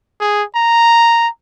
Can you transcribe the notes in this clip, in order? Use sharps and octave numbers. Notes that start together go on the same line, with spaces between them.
G#4
A#5